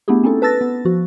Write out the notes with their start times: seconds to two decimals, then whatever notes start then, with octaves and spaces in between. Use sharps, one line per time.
0.08 A3 B3 D4 E4 G4 G#4
0.23 C4 C#4 D#4 E4 A4
0.42 B4 A5 E6 A6 A#6
0.61 B3
0.85 F3 F#4